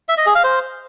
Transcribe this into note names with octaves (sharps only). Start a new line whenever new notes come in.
E5
D#5
G#4
F5
C5